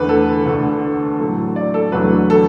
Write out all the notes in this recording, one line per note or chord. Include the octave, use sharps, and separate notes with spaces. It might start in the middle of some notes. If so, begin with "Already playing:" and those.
Already playing: E2 D3 A3 B4
A4
D2 D3 A3
A2 F#3 A3
D5
A4
E2 D3 F#3 A3 B4
A4